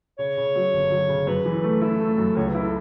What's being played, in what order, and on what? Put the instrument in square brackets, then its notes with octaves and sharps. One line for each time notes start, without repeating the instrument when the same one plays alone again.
[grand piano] C#3 [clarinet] C#5
[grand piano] C#3
F#3
G1
F#3
C#3
[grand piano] F#2 [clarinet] B4
[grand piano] E3
A3
[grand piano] E4 [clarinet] A4
[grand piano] A3
F#2
[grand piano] C#2 [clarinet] C#5
[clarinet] B4
[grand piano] E4
[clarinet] A4